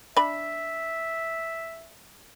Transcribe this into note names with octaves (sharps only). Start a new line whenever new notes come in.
D4 E5 B5